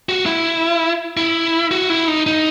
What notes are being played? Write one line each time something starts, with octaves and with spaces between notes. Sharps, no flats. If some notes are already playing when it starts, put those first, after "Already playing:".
F#4
E4
E4
F#4
E4
D#4
D#4